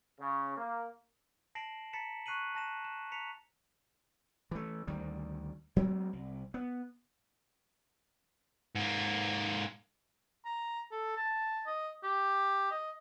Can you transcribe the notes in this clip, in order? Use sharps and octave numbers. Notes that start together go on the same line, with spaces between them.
C#3
A#3
A5 A#6 C7 D7 E7 F#7
A5 A#5 A6 B6 C#7 E7
C#6 F#6 C7 D#7 F#7
A5 A#6 E7
E7
A#5 B6 C#7 F7
E3 A3
D2 D#3 G3
F#3 G#3 A#3 C4
C2
B3
G#2 A#3
A#5
A4
A5
D#5
G4
D#5